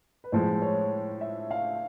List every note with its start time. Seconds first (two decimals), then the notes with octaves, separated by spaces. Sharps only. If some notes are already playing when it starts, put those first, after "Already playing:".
0.24 B4
0.32 A2 F3 G#3 C5
0.62 C#5
1.21 E5
1.51 F5